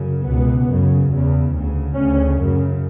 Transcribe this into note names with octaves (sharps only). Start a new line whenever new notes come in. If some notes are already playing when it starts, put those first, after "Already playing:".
Already playing: F#2 C#3
C#2 B2 B3
F#2 C#3
E2 C#3
D2 C#3
D2 C#3 C#4
F#2 C#3